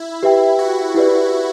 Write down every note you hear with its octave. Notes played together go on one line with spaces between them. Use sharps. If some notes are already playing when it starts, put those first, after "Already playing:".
Already playing: E4
G4 B4 E5 G5
F#4
E4 G4 B4 D5